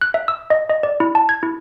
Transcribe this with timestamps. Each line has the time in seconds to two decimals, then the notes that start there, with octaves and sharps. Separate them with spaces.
0.01 F#6
0.14 E5
0.28 E6
0.50 D#5
0.70 D#5
0.83 D5
1.00 E4
1.15 A5
1.29 G#6
1.43 E4